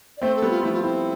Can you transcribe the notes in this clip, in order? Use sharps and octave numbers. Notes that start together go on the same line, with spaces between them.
D5
A3 C4 C5
A4
G3 B3
F4
F3 A3 E4
F4
A3 C4 E4